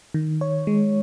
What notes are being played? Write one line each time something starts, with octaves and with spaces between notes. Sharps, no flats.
D#3
C#5
G#3